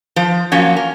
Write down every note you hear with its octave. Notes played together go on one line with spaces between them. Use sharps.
F3 C5
F3 F#3 A#3 C#4
A#4